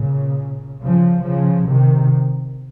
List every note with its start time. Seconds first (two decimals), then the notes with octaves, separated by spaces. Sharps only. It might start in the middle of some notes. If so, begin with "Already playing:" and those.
Already playing: A#2 C#3
0.81 C#3 F3
1.23 C#3 F3
1.66 C3 D#3